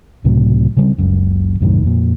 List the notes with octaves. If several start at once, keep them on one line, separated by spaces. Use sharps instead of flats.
C#2 A2 C3 F#3
C#3 G3 C4
F#1 C#2 F#2
C2 F#2 A2 D#3
F2 A#2